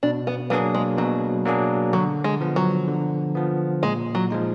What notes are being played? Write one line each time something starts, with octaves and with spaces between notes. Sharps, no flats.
B2 D4
B3
F#3 A#3 B3 D4 G#4
G#3
B2 F#3
F#3 A#3 D4 G#4
D3 F#3
G#3
F3 B3
F#3
D3
F3 B3
A#2 G#3
F#3
F3 G#3 D#4